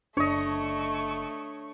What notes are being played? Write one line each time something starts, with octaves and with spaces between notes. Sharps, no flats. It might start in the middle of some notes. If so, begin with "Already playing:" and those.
F#1 A3 D4 C#5 D#5 C#6